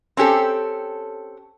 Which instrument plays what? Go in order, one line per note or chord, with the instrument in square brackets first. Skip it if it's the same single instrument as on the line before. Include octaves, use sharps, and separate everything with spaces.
[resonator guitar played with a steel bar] C4 C#4 G4 A4